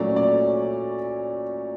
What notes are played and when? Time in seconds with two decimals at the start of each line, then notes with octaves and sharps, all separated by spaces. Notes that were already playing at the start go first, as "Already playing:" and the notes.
Already playing: A#2 F#3 A3 C#4 D5
0.16 D5